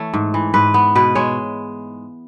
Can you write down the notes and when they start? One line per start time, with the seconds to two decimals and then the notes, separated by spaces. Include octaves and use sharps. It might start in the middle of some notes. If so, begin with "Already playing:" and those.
Already playing: E3 A3 C#5
0.14 G#2
0.34 E3
0.54 G#2 B4
0.74 B3
0.95 B2 B4
1.15 G#3 C#5